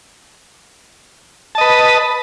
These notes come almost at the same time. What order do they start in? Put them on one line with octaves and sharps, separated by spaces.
A5 D#5 B4